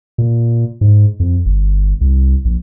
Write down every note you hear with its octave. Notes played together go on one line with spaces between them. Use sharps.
A#2
G#2
F2
G1
C2
A#1